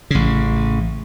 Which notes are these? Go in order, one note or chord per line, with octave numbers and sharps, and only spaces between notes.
A1 C#3